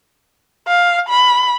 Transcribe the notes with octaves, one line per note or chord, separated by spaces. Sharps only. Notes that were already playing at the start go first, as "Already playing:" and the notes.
F5
B5